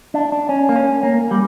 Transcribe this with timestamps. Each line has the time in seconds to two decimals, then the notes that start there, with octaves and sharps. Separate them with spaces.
0.14 D4
0.32 D4
0.49 C#4
0.69 A#3
0.76 C#4
1.03 A#3
1.21 A#3
1.31 G3